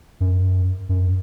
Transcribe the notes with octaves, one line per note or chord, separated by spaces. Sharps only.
F#2
F#2